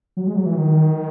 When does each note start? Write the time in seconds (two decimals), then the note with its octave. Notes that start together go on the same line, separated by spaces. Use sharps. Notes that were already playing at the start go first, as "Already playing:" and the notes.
0.17 F#3
0.27 G#3
0.36 F#3
0.46 E3
0.55 D#3